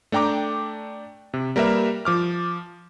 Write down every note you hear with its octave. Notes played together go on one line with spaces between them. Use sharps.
A3 D4 G5 A#5 D6
C3
G3 A#3 A#4 B4 E5
F3 D6 F6